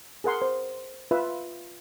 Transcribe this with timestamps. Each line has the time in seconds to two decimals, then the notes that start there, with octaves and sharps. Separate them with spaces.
0.24 G#4 A#4 F#5 C6
0.42 C5
1.11 F4 B4 E5